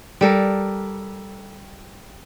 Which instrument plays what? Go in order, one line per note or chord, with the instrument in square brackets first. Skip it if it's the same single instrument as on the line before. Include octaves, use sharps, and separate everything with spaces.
[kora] G3 A4 A#4